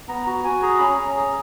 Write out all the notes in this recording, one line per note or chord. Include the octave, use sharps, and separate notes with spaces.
B3 A#5
F#4 A#5
F#4 G#5
G#4 A#5
C#4 B5
A#5
C#4
A#5
G#4